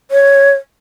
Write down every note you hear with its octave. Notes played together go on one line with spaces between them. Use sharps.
C#5